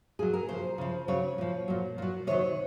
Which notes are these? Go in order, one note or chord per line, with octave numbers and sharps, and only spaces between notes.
A#2 F#3 G#4
A#4
C#3 F3 C5
C#3 F3
C#3 F#3 C#5
A#2 F3
A#2 F#3
A#2 F#3
C3 D#3 F#3 C#5